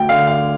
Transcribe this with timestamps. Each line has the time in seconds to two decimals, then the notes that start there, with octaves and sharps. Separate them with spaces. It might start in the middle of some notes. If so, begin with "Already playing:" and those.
Already playing: D2 G5
0.09 D3 F5
0.27 F5